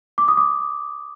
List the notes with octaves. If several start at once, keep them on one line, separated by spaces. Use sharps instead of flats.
D6
D#6
D6